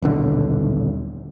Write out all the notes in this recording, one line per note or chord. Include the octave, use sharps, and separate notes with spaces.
D#1 B1 D3